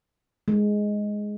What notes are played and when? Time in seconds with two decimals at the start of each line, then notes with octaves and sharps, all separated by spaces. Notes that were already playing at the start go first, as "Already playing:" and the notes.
0.48 G#3